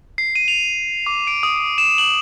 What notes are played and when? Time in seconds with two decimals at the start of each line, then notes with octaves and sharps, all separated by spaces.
0.18 C7
0.35 D#7
0.48 F7
1.06 D6
1.27 D7
1.43 D#6
1.78 E7
1.98 F#7